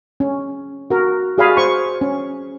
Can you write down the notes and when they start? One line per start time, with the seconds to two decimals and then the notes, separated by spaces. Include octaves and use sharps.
0.20 C#4
0.90 F#4 A#4
1.38 F#4 G#4 D5 F5 G#5 B5
1.57 C5 C#6
2.01 C#4